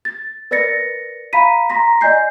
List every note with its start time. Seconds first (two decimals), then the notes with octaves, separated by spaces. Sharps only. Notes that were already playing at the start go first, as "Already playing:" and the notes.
0.05 A6
0.51 A#4 B4 D5 A6 A#6 C#7
1.33 F5 A#5 B5 B6 D#7
1.70 A#5 C6 A#6 B6
2.01 D5 D#5 G#5 G6 C7